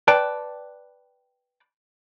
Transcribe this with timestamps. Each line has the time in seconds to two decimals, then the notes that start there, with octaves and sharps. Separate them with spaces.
0.08 B4 D5 G5 A5